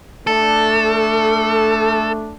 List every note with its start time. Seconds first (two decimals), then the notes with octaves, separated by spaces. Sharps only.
0.27 A3 D4 A4